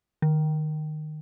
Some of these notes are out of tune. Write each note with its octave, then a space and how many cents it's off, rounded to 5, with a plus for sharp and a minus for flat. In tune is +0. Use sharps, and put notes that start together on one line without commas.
D#3 -25